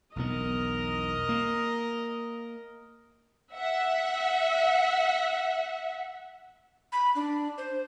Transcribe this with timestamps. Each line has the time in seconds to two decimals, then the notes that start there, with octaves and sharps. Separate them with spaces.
0.16 E1 B1 B3 A#4 D#5
1.29 A#3
3.54 E5 F#5
6.92 B5
7.15 D4
7.58 C5